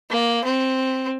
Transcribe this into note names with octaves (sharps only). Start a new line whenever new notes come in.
A#3
C4